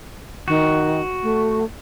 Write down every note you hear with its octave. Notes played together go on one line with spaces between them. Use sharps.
D#3 F#4
A3